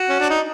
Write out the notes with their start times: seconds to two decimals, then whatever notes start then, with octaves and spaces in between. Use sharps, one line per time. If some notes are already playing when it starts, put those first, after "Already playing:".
Already playing: F#4
0.09 C#4
0.20 D4
0.30 D#4